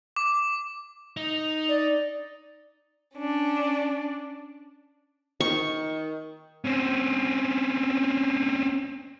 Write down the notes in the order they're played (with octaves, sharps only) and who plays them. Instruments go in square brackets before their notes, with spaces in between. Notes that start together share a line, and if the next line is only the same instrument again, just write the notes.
[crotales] D6
[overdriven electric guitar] D#4
[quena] D5
[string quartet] C#4 D4
[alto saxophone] D#3 [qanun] C#6
[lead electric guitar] C4 C#4